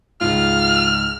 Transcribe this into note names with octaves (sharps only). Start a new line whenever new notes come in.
C#2 G#2 F4 F6